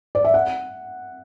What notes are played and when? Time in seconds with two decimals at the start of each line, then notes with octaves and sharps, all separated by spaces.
0.15 D5
0.25 E5
0.34 F#5